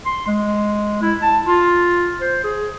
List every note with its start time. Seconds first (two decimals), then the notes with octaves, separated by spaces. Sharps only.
0.06 C6
0.27 G#3
1.03 E4
1.22 A5
1.47 F4
2.21 C5
2.44 G#4